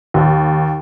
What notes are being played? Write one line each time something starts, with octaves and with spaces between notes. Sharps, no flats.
D#2